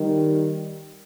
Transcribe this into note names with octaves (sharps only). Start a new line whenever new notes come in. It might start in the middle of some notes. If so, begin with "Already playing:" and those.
Already playing: D#3 G3